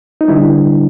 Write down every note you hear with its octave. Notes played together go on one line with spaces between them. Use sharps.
D#4
D3 G3 D4 E4